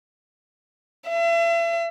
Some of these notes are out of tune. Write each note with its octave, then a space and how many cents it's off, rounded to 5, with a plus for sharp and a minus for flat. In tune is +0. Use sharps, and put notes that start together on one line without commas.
E5 +40